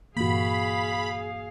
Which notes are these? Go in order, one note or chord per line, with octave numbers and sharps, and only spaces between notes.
G2 A#2 E3 A#3 F#4 G#4 F5 B5